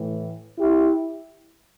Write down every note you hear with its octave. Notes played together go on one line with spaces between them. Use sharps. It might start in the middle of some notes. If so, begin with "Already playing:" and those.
Already playing: A2 E3
E4 G4